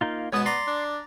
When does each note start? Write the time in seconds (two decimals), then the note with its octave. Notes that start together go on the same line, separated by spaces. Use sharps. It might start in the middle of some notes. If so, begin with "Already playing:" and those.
0.01 A#3 D#4 F4
0.33 G#2 B2 B3 C#5 A5 D#6
0.46 D5 A#5 C6
0.68 D4